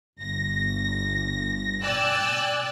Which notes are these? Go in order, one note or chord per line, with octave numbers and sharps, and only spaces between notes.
G1 A#6
D5 G5 G#5 E6 F#6 A6